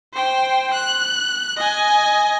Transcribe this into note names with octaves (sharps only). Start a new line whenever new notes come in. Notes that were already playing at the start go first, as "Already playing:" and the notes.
C5 G5
F#6
D#5 G#5